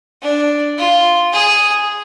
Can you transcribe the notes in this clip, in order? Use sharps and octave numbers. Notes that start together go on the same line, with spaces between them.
D4
F4
G#4